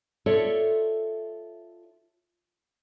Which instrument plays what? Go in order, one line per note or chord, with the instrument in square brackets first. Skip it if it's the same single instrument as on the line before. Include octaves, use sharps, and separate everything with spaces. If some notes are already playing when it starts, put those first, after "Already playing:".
[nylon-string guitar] F4 A4 C#5 D5 E5